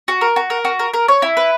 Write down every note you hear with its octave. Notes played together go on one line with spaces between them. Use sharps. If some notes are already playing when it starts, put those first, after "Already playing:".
F#4
A#4
F#4
A#4
F#4
A#4
A#4
C#5
E4
B4